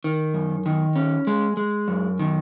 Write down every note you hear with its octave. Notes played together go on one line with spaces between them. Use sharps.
D#3
F#2
D#3
C#4
G#3
G#3
F#2
D#3